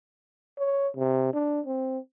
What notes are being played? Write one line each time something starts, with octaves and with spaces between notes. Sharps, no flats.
C#5
C3
D4
C4